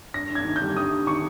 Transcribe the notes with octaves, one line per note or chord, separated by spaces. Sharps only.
G2 A#6
G2
G#6
D#3
G6
G3
G2 D#6
G2
D#3 C#6